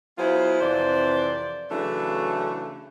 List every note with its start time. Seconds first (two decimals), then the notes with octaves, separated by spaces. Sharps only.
0.18 F#3 B3 E4 F4 G#4 C5
0.60 F2 C3 E3 C5 D5
1.71 C#3 E3 F#3 A3 D4 E4